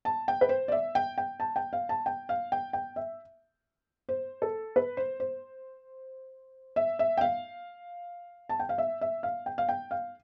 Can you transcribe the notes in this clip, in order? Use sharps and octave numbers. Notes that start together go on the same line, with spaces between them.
A5
G5
B4
C5
D5
E5
G5
G5
A5
G5
F5
A5
G5
F5
G5
G5
E5
C5
A4
B4
C5
C5
E5
E5
G5
F5
A5
G5
F5
E5
E5
F5
G5
F5
G5
F5